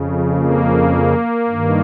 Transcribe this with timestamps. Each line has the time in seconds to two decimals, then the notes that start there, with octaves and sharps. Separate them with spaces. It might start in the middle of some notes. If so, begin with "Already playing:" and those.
Already playing: F2 C#3
0.35 A#3
1.48 G2 D#3